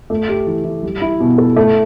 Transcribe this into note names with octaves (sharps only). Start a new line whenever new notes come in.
A3
G4
E3
E3
G3
E4
B2
A4
A3